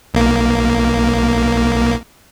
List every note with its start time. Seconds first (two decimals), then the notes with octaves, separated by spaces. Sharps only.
0.14 B1 A#3